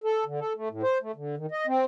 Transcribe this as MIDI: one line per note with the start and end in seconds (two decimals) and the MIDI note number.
0.04 0.24 69
0.26 0.40 50
0.40 0.53 69
0.55 0.69 57
0.70 0.83 45
0.83 0.98 72
1.02 1.12 57
1.16 1.35 50
1.37 1.46 51
1.52 1.66 75
1.67 1.85 60